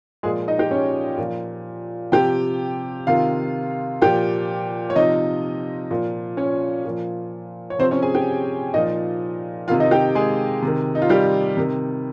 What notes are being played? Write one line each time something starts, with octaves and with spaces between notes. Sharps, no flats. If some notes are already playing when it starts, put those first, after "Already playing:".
A#2 F3 G#3 G#4
D#4 D#5
G4 G5
C#4 C#5
A#2 F3
C3 F3 G4 G5
C3 D#3 F4 F5
A#2 F3 G4 G5
C#5
C3 F3 D#4 D#5
A#2 F3
C#4 C#5
A#2 F3
C#5
C3 F3 C4 C5
C#4 C#5
G#4 G#5
G4 G5
A#2 F3 D#4 D#5
C3 D#3 F4 F5
D#4 D#5
G4 G5
G#3 G#4
C3 D#3
D#4
F4
G3 G4
C3 D#3